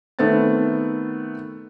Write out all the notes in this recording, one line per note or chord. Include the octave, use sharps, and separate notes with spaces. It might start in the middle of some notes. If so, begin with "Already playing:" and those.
D#3 A3 B3 C4 A6